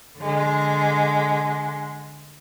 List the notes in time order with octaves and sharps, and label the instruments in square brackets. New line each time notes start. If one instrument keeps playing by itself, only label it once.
[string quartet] D3 G#3